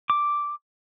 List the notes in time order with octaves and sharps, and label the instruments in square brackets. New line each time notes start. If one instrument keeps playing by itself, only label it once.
[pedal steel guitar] D6